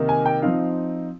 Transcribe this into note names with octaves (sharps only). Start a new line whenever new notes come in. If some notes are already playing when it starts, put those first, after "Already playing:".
Already playing: C3 D#3 A#3 D#4
G#5
G5
F3 C4 D#4 F5